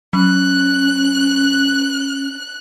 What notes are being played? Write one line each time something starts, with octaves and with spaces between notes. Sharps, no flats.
F#3 C#4 F#6